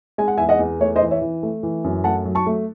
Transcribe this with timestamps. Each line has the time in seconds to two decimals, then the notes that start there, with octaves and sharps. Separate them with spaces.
0.18 G#3 G#5
0.28 F#5
0.38 E2 E5 G#5
0.49 D#5 F#5
0.59 E2
0.80 A3 C#5
0.96 C5 D#5
1.01 E3
1.11 C#5 E5
1.21 E3
1.43 A3
1.63 E3
1.84 F#2
2.04 A3 F#5 A5
2.25 F#3
2.35 A5 C#6
2.46 A3